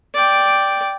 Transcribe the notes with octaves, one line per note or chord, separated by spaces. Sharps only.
D5 G5